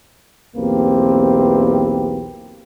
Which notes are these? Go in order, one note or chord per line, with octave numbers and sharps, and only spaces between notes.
B1 E2 A#3 C4 G4 B4